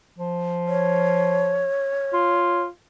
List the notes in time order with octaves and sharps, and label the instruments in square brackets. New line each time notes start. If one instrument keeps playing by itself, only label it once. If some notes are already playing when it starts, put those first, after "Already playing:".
[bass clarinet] F3
[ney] C#5
[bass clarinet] F4